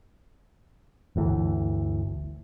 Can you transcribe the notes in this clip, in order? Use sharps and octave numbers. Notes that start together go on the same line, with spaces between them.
G1 D2 E3